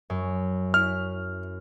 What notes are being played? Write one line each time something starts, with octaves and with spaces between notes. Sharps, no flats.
F#2
C#4 E4 F6